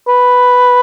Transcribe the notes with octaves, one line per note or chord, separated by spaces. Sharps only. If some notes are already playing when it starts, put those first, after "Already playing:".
B4